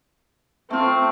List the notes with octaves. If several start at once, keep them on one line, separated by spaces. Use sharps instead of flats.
A3 C4 F4